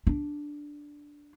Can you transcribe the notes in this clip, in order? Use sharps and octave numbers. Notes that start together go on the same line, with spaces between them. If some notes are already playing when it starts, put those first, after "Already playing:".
D4